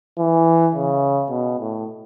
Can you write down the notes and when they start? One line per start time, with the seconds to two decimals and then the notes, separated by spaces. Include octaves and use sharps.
0.18 E3
0.75 C#3
1.31 B2
1.59 A2